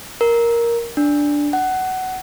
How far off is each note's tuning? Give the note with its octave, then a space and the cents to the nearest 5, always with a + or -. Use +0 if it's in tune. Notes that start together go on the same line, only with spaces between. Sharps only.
A#4 +5
D4 -5
F#5 +15